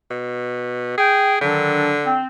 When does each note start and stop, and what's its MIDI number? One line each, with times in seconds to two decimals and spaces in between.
0.11 0.94 47
0.97 1.39 68
0.97 1.34 79
1.41 2.19 50
1.41 1.94 51
1.41 1.94 54
1.41 1.94 62
2.04 2.26 60